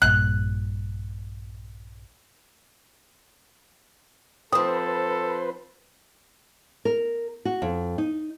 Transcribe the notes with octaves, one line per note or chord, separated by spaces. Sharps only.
A#1 G2 A#2 F#6
F3 C4 A4 B4 C5 D#6
A#4
F#4
F2
D#4